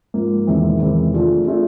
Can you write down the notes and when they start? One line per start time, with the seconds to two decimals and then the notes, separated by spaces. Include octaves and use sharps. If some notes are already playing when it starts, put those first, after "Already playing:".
0.14 G#2 F3 A#3
0.47 E2 C3 D#3 G#3 C4
0.80 E2 C3 D#3 G#3 C4
1.14 F3 A3 D4 F4 G#4
1.47 F3 A3 D4 F4 G#4